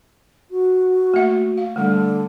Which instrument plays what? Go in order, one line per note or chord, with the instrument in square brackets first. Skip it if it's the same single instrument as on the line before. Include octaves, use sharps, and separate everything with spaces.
[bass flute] F#4
[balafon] A3 A#3 E5
F5
[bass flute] D3 [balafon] G3 A3